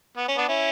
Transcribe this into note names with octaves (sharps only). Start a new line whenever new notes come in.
B3
C#4
B3 D4
C#4 E4